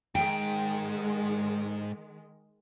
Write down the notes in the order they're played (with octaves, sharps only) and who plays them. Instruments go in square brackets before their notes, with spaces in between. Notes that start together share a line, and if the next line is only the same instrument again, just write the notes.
[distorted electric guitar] G#2 [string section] D#3 G#3 [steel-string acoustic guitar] G5